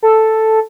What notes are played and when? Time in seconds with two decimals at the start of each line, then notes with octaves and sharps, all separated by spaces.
0.03 A4